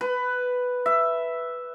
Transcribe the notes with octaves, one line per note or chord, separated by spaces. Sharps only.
B4
E5